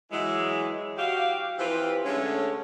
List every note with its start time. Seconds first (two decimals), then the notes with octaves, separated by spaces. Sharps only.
0.12 E3 F#3 G#3
0.98 F#4 G4 F5
1.59 E3 F3 C4 F4 G4 B4
2.05 D3 G#3 A3 C#4